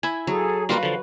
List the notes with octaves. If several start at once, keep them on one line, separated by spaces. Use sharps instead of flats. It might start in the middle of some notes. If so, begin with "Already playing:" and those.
E4 E5 G#5
F#3 G#4 A4
G3 A#3 F4 F#4 B4 F5
D3 F3